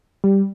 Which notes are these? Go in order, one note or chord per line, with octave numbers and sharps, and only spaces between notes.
G3